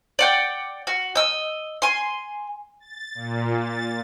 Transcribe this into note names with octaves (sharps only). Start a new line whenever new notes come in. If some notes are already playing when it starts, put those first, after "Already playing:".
D5 F#5 G5
F#4
D#5 E6
G#5 C6
A6
A#2
A6